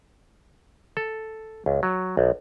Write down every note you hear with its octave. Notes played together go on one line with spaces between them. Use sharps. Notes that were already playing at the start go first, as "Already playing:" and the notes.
A4
C#2
F#3
B1